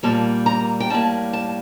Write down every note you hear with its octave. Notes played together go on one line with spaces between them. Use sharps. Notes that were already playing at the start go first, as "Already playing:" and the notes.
A#2 G3 A#3 A5
A#5
G5
A2 G3 A#3 A5
A5